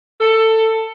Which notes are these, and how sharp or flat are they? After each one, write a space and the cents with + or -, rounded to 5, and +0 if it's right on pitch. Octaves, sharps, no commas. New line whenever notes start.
A4 +15